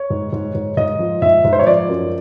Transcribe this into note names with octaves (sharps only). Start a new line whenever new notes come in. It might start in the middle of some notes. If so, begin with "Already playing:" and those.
Already playing: C#5
G#2
G#2
G#2
G#2 D#5
F3
G#2 E5
G#2
C5
C#5
F3 D5
F#2